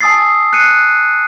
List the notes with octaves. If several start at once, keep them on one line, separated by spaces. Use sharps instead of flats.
G#5 A5 D#6 E6 A6 C7
F#6 C7 C#7 D#7